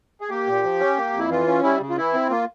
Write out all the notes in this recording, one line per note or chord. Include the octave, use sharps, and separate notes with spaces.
G#4
A#3 G4
A#2
F3
C#4
A#3
F2
E4
E3 F4
C#4
G3 E4
C#3
F4
E3 E4
C4
A#3 F4